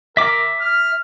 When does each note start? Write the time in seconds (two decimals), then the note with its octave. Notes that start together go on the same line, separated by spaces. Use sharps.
0.17 A#4 E5 D6
0.60 F6